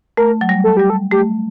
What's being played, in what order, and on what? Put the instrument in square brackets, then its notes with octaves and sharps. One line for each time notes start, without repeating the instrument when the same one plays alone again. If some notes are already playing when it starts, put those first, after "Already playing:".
[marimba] A3 [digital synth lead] A#4
[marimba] F#3
G3
[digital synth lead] A4
[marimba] G3 [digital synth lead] G4
[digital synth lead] A4
[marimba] A3 [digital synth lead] G4